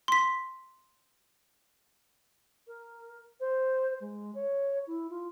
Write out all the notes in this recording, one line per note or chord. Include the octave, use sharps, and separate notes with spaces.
C6 B6
A#4
C5
G#3
C#5
E4
F4